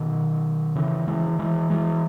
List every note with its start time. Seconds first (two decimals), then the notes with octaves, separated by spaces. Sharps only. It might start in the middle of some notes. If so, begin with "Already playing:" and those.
Already playing: B2 D#3
0.76 C#3 E3
1.08 E3 G#3
1.39 E3 G#3
1.70 E3 G#3